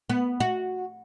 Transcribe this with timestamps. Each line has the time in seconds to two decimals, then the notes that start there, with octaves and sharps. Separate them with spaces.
0.10 B3
0.40 F#4